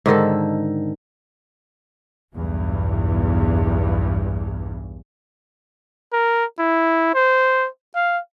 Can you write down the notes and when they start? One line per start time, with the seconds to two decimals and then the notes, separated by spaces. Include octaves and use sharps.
0.06 G#2 D3 D#3 A4
2.32 B1 E2 G2
6.13 A#4
6.59 E4
7.15 C5
7.95 F5